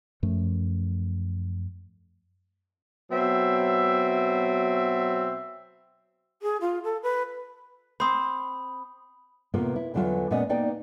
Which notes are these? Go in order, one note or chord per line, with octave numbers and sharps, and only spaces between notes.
F#2 F3 A3
B2 F#3 C4 E5
G#4
F4
A4
B4
C4 C5 B5 D#6
A2 C3 A#3 B3 F4
E4
E2 D3 E3 F#3 F4
A#2 G#3 B3 C#4 D5 D#5
A#3 B3 D#4 D5 G5